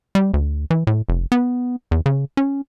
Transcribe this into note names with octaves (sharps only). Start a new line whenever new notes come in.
G3
D2
E3
A2
F1
B3
E2
C#3
C#4